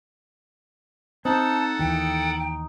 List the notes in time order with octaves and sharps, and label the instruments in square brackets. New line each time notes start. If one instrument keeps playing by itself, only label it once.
[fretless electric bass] C4 [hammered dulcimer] D#4 [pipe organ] A4 F#5 [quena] A5
[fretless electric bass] D#2 E3 [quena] G5